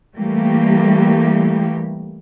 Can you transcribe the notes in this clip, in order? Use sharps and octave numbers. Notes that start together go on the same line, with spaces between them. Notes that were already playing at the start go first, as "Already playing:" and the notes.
E3 G3 A3 A#3 G4